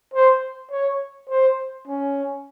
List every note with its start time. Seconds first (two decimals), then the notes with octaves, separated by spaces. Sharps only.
0.14 C5
0.71 C#5
1.30 C5
1.88 C#4